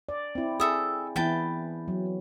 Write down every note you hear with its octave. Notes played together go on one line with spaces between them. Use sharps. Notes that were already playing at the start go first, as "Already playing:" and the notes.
D5
C4 E4
G#4 A4 E5 D#6
E3 B3 E4 B4 G5 A5
F#3